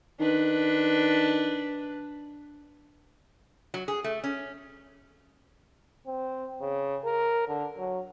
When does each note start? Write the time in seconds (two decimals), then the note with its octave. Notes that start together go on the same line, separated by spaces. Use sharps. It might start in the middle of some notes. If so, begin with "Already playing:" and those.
0.20 D#3 D4 B4
3.74 F#3
3.88 G#4
4.04 A3
4.24 C#4
6.07 C4
6.60 C#3
7.05 A#4
7.48 D3
7.78 F#3